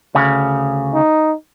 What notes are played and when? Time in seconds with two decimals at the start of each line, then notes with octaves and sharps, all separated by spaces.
0.15 D2 C#3
0.94 D#4